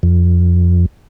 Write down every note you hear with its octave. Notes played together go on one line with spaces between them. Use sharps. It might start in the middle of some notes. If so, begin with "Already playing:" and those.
F2